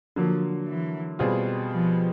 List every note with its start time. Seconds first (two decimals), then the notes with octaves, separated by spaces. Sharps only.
0.16 D3 F3 F#3 A#3
0.68 E3
1.19 B2 G3 C4 F4 G#4
1.71 F3